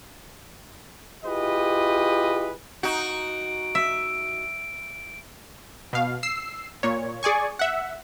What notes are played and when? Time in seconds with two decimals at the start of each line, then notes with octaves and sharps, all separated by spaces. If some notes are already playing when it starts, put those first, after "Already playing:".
1.25 E4 F4 G4 G#4 B4 D#5
2.83 D#4 F#4 D7
3.75 E5
5.93 B2 F5
6.23 E6 C7
6.83 A#2 C#5
7.23 G#4 D5 G#5 C#6
7.59 E5 F#5